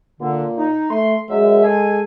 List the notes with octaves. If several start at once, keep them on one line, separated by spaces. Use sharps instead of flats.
A#2 D3
D#4
A3 C6
F#2 G#3 E5
G#4 A4 G#5